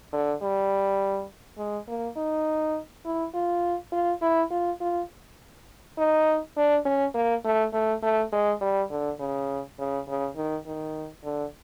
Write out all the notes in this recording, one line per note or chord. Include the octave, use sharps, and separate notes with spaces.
D3
G3
G#3
A#3
D#4
E4
F4
F4
E4
F4
F4
D#4
D4
C#4
A#3
A3
A3
A3
G#3
G3
D3
C#3
C#3
C#3
D#3
D#3
D3